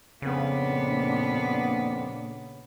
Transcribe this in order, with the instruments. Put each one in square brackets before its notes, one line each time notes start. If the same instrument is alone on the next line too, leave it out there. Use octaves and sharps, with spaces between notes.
[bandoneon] F2 [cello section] A#2 A#3 D4 [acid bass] C#3 [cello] B3